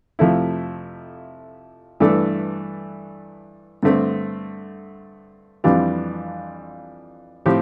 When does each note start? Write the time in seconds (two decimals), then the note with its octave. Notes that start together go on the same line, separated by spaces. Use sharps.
0.19 F2 C3 F3 A3 E4
2.00 G2 E3 A3 D4 A4
3.83 G2 D3 A3 C4
5.64 F2 E3 G3 D4 F4
7.46 A2 F3 C4 G4